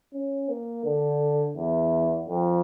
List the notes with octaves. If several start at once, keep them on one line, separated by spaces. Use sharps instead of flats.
C#4
A#3
D3
E2
F2